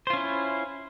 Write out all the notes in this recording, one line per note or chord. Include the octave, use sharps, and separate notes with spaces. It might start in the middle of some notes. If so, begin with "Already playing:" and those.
C#4 E4 F4 C5